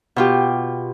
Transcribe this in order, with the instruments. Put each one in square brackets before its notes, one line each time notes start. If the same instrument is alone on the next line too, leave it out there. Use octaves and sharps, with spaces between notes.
[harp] B2 F4 G4